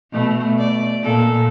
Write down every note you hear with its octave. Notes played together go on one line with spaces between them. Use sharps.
B2 A3
D5
A#2 A4